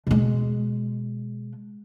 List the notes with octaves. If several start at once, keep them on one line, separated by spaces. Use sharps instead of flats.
B2 G#3